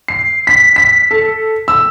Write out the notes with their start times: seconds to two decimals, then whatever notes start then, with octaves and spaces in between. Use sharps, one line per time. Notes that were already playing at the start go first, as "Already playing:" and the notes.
0.08 C7
0.47 B6
0.76 B6
1.11 A4
1.68 E6